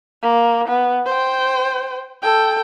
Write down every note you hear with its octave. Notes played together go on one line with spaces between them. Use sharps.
A#3
B3
C5 G5
A4 G5